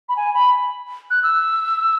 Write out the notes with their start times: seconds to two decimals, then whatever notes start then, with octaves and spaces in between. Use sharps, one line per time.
0.09 B5
0.16 G#5
0.34 B5
1.10 F#6
1.23 E6